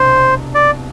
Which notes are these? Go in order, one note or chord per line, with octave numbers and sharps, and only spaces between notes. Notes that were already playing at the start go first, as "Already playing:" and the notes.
Already playing: C2 B2 D4 C5
D5